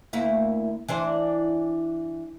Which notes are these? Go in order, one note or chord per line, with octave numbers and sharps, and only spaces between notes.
D2 A#3 E4
E3 D4 C5